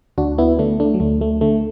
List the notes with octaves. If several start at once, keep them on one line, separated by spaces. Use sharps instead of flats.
D2 D4 F#4
B3 E4
D3 A3 D4
A3 D4
F#3
D2 A3
A3
D3 A3